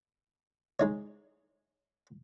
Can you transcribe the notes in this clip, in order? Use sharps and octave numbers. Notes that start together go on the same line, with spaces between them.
G#3 D#4 C#5